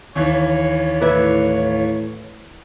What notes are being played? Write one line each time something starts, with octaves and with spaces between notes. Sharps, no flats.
D#2 E3 C#5
A2 E4 B4 D5